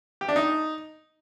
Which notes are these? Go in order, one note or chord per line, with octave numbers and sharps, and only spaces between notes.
G4
D4
D#4